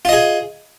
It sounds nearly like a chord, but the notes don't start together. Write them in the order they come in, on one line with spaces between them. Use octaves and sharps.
F4 D#5 G#4